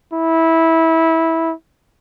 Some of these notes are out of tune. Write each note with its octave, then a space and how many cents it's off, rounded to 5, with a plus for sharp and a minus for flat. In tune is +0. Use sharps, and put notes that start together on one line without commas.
E4 -15